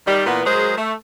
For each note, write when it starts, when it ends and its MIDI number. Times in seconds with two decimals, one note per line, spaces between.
0.07 0.25 51
0.07 0.25 55
0.26 0.45 46
0.26 0.45 52
0.26 0.45 59
0.45 0.75 54
0.45 0.75 56
0.45 0.75 68
0.45 0.75 70
0.45 0.75 72
0.77 0.93 57